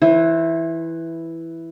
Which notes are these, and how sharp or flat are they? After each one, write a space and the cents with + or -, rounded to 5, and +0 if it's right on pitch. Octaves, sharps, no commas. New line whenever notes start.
E3 +0 C5 +35